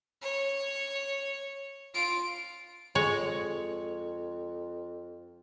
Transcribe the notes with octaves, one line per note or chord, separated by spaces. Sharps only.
C#5
F4 D7
F2 G#3 C#5